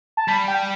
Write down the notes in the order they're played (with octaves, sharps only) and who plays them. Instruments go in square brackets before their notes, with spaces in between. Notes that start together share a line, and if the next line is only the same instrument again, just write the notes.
[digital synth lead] A5
[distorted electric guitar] G3 [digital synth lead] B5
[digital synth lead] G5